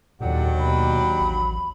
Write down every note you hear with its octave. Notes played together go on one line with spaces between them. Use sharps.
D#2 A#2 F#3 D4 G4 A4 D5 F#5
B2 B5
A1